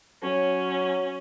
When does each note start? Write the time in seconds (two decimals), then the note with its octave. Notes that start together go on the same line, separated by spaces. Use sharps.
0.23 F#3 C#4